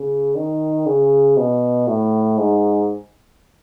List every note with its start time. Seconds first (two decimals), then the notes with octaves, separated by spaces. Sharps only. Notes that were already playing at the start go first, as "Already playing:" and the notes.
Already playing: C#3
0.36 D#3
0.86 C#3
1.37 B2
1.87 A2
2.38 G#2